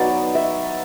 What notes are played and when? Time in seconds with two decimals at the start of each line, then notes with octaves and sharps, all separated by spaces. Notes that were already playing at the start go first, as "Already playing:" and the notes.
Already playing: F#3 B3 D#4 D5
0.35 E5